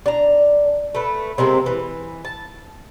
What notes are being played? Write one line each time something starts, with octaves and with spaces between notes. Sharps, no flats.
D4 A#5
A3 B4
C3 G#3 A#3 C4
E3
A5